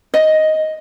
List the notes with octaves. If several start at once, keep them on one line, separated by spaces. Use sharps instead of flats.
D#5